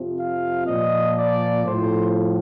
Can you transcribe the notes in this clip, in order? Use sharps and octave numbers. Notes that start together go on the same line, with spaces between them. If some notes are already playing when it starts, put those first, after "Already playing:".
Already playing: F2 C3 F3
F5
A#2 F3 D#5
D5
A2 F3 C5